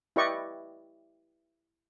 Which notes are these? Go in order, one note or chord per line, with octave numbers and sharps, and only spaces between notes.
E4 G4 B4 D5 D#5 C#6